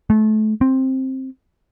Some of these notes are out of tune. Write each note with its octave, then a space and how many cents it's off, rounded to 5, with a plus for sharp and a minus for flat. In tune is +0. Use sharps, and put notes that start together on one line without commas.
A3 -30
C4 +10